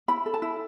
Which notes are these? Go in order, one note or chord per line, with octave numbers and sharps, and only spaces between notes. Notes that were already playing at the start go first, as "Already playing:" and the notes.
E4 B5
A4
A5
E4